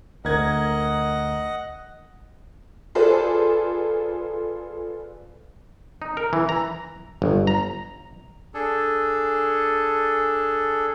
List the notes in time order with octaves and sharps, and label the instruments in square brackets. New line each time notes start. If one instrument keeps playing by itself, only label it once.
[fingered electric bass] D2 [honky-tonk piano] A#4 G#6 [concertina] D#5 F#5
[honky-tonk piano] F4 G#4 A4 B4 C5 D5
[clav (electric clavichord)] D#4
A#4
E3
A#5
G1
A#5
[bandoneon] D4 G#4 A4